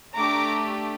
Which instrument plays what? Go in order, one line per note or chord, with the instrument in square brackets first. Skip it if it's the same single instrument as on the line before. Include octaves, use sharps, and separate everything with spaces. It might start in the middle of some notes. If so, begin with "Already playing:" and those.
[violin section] A3 D4 G4 A#5 D6